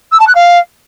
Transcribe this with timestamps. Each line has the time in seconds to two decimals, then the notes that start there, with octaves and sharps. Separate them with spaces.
0.12 E6
0.20 A5
0.27 F#6
0.35 F5